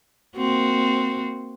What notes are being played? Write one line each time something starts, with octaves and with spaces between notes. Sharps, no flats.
A#3 C4 F#4